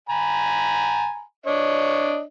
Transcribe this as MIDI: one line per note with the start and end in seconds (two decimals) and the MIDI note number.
0.09 1.22 80
0.09 1.22 82
0.09 1.22 83
1.46 2.21 62
1.46 2.21 73
1.46 2.21 75